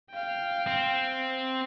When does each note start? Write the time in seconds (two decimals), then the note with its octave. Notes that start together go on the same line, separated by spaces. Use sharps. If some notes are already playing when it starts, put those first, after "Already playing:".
0.11 F5 G5
0.67 C4